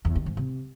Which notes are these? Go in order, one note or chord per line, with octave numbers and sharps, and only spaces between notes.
E2
D#3
G#2
C3